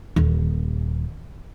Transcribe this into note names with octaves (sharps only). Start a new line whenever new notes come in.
D#1 D#2